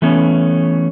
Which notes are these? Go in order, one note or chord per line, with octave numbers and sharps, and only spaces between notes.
E3 A3 B3 C#4